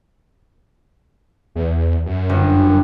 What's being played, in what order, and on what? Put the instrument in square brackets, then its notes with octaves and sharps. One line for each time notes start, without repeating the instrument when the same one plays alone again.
[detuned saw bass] E2
F#2
[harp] G1